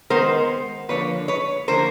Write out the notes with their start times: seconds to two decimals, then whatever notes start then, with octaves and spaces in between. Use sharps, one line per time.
0.10 D#3 G#3 B3 A#4 C5
0.89 D3 F3 A#3 B4 C#5
1.28 B4 C#5
1.68 D3 F3 A#3 A#4 C5